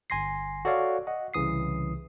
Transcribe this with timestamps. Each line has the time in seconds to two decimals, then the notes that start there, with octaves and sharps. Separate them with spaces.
0.10 G1 G#5 C6 A#6 C7
0.65 F#4 A4 C#5 D5 F5
1.07 D#5 F#5
1.34 C2 C#3 E3 D#6 C7